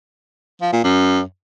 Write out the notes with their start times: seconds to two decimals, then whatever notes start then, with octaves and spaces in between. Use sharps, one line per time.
0.61 F3
0.73 A#2
0.84 F#2